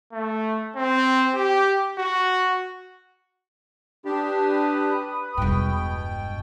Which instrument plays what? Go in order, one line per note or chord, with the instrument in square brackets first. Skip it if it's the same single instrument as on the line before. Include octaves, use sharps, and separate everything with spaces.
[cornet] A3
C4
G4
F#4
[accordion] D4 G4 [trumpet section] B4 B5 D#6
[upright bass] E1 G2 [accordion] B2 G5